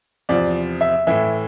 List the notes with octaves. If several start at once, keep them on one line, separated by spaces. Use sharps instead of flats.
E2 C3 F3 D5
E5
A2 E3 E5